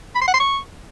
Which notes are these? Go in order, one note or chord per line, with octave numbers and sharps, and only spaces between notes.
B5
C6
F#5
C6
C#6